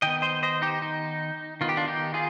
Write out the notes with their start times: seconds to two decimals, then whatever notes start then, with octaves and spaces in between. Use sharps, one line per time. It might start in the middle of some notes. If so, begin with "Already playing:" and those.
0.02 D#3 B3 D#5 G5
0.22 C5 D#5
0.43 C5 D#5
0.62 D#4 G4
0.82 D#4
1.61 D#3 B3 F4
1.69 G4
1.77 D4 F4
1.88 D#4 G4
2.14 F4 G#4